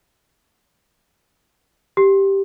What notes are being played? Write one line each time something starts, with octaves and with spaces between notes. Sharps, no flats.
G4